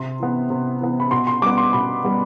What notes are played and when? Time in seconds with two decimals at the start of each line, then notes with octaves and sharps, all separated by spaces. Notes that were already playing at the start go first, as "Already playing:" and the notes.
Already playing: C3 C6
0.19 E3 B3
0.50 C3
0.81 E3 B3
1.00 B5
1.11 B2 C6
1.27 C6
1.42 G3 B3 D6
1.57 C6
1.73 B2 B5
2.04 G3 B3